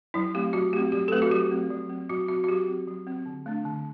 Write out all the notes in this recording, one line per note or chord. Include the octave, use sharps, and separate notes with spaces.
F#3 E4
A3 C4 G4
F#3 F#4
A3 C4 G4
F#3 G4
A4
A3 C4 B4
F#4
F#3 G4
A3 C4
F#3
C4
F#3 F#4
C4 F#4
F#4
F#3 G4
C4
F#3
C4
D3
A3 D4
D3